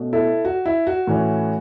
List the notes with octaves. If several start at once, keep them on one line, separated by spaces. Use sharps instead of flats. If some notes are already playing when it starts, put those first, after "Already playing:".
Already playing: B2 A3 C#4
E4 A4
F#4
E4
F#4
A2 E3 C#4